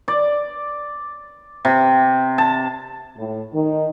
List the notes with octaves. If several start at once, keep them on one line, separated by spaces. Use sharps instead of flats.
D5
C3
A5
A2
D#3